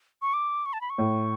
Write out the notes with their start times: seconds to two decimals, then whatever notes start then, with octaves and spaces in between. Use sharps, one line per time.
0.22 C#6
0.34 D6
0.66 C#6
0.73 A5
0.81 B5
0.90 C#6
0.98 A2